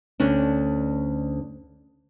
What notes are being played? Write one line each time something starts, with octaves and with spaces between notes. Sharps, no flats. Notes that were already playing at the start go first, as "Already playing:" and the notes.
D2 C#4 D4